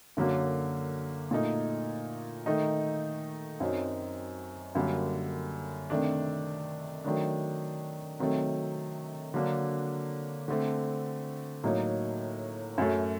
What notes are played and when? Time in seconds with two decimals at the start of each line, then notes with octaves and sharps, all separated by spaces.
0.17 F#2 D3 F#3 A#3
1.31 A#2 A3 D#4
2.46 D#3 A3 D#4
3.60 F#2 F#3 C4 D#4
4.75 F#2 D3 G3 A#3
5.90 C3 D#3 A3 D4
7.04 D#3 F#3 A3 D4
8.19 C3 D#3 F#3 A3
9.34 D3 F#3 A#3 D4
10.48 D3 A3 C4
11.63 A2 F#3 A#3 D#4
12.78 F#2 F#3 A3